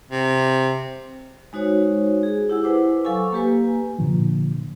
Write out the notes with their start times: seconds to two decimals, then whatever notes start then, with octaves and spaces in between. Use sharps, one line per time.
0.11 C3
1.53 G#3 D#4 F#4 C5 C#5
2.23 G#4
2.50 E4 G4 F#5 G#5 E6
2.63 E4 B4 C5 F#5 D6
3.03 F#3 A4 F5 G#5 C#6 E6
3.32 A#3 G4 B4 G#5
3.99 A#2 D3 F3